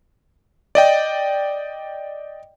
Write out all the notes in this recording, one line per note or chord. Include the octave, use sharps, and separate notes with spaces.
D5 D#5 G5